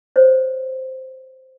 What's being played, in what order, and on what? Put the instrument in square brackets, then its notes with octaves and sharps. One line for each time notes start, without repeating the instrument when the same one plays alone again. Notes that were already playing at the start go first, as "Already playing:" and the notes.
[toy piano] C5 C#5